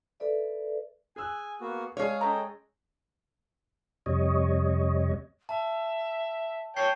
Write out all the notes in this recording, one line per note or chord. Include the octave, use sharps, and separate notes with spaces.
A4 B4 D5 E5
G#4 G#5 E6 F#6
A#3 B3 F#4
G#3 G#4 C#5 F5
C#4 A4 D#5 G5 A#5
F2 C3 G3 C#5 D#5
E5 A5
C#5 G5 A5 G6 C7